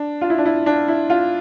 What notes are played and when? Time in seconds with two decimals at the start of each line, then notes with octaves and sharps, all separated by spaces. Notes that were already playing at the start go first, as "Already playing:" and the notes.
Already playing: D4
0.21 F4
0.30 E4
0.38 D4
0.46 E4
0.66 D4
0.88 E4
1.10 F4